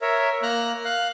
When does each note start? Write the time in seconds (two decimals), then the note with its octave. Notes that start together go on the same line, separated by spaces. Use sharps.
0.02 A#4 C#5 E5
0.43 A#3 A#5 F6 F#6
0.85 F5 F#6